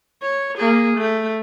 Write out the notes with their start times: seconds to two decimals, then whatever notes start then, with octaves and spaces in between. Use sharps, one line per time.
0.22 C#5
0.58 A#3 G#4
0.97 A3